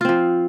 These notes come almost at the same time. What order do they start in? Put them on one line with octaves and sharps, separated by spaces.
F4 C4 F3